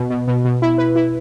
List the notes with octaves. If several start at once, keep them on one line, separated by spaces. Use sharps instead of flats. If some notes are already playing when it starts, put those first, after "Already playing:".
Already playing: B2
B2
B2
B2
E4
B4
E4